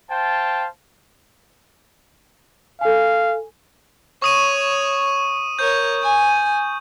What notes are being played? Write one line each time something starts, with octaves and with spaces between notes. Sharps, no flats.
C5 F5 G5 A5
A4 F5 G#5
C#5 C#6 D#6 D#7
A#4 C#5 G6
G#5